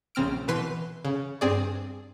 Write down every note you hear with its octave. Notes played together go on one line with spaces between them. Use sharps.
A#1 C#3 C4 F6 D7
B2 E3 B4 C6 F#6 C7
C#3
G2 C4 G#4 D5